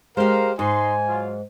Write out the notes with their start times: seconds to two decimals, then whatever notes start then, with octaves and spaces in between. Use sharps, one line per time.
0.17 G#3 G4 A#4 C5 F5
0.59 G#2 D#4 G#5 C6
1.08 F#3 F4